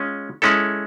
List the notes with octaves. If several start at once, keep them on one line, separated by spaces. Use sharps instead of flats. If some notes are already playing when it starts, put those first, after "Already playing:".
Already playing: G#3 C#4 F4
G#3 C#4 E4 A4